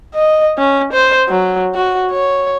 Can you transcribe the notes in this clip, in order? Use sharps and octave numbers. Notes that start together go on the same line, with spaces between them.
D#5
C#4
C5
F#3
F#4
C#5